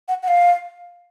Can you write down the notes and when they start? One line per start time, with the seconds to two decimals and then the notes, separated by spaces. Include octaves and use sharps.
0.08 F#5
0.23 F#5
0.28 F5